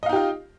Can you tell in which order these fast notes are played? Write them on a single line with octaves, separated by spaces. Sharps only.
D#5 F5 D#4 G4 F4